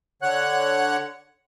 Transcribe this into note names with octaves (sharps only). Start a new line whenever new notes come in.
D3 C#5 F#5 F#6